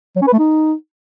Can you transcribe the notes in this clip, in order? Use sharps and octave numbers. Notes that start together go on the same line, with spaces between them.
F#3
C#4
B4
A3
D#4